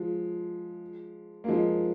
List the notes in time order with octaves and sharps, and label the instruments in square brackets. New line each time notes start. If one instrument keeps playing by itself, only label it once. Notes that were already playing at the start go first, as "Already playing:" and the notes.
Already playing: [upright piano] F3 G#3
A#3
F3 G#3